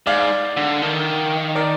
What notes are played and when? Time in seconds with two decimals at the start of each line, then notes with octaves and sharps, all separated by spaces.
0.07 G#2 D5 F5
0.57 D3
0.82 D#3
1.55 A#4 D5